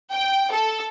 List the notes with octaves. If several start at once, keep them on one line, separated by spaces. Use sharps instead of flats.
G5
A4